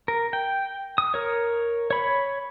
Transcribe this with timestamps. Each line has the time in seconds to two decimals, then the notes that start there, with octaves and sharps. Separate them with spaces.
0.08 A#4
0.33 G5
0.98 D#6
1.14 A#4 C#5
1.91 C#5 B5